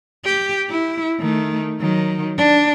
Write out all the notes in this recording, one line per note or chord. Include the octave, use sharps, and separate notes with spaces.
G4
E4
D#3 A3
D#3 F#3
D4